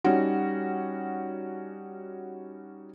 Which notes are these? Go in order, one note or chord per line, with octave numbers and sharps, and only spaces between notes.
G3 C#4 D#4 F#4